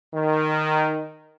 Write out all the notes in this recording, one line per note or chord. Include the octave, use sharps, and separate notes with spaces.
D#3